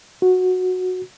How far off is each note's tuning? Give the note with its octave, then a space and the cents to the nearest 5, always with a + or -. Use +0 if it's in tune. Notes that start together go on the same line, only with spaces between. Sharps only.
F#4 -10